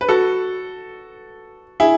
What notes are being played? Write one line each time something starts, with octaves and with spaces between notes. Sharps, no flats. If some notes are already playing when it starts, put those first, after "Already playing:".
B4
F#4 A4
E4 G#4